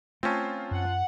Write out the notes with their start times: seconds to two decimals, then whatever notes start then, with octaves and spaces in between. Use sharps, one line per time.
0.23 A3 C4 C#4 F4 C5 A5
0.71 F#2 F#5